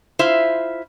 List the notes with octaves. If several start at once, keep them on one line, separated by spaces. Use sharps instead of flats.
E4 F4 C5 E5